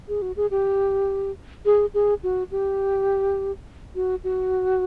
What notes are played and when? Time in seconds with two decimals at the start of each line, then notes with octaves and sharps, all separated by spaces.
0.08 G#4
0.22 F#4
0.36 G#4
0.51 G4
1.66 G#4
1.94 G#4
2.23 F#4
2.51 G4
3.95 F#4
4.24 F#4